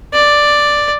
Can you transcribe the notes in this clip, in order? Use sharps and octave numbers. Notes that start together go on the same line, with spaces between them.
D5